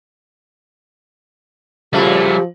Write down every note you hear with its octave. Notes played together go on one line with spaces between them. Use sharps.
A#2 C#3 F3 G3 A3 F#4 G4